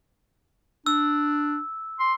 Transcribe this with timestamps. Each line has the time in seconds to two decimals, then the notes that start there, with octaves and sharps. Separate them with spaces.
0.86 D4 E6
2.00 C6